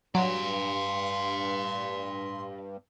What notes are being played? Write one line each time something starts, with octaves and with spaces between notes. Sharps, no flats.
G2 F#3 D5 F5 C6